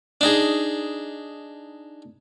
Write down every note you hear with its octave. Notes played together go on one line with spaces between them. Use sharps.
D4 D#4 G#4